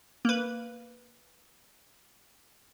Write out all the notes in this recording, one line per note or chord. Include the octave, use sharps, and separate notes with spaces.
A#3 B4